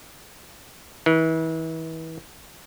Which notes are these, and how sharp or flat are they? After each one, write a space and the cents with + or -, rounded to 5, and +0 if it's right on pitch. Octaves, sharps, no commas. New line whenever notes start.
E3 -35